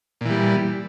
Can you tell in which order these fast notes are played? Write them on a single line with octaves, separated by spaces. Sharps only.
A#2 E3 G3